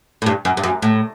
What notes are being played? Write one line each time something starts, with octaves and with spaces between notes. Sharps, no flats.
A2
G2
F#2
G2
F#2
A2